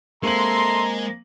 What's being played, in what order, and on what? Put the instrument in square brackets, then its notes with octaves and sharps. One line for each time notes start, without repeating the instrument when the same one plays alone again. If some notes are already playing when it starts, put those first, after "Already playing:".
[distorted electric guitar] G#3 [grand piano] A#3 C4 F#7 [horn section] A4 E5 C6 [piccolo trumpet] A#5